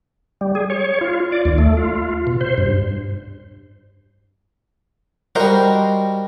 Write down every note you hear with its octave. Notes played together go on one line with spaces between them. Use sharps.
G3
G#4
C#5
F4
D5
D#2
A3
F4
B2
C5
G2
G3 F#4 A#4 C5 D#5